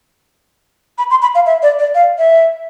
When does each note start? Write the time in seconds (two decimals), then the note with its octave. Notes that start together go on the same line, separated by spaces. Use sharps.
0.98 B5
1.10 C6
1.22 B5
1.35 F5
1.46 E5
1.62 D5
1.79 D5
1.95 F5
2.18 E5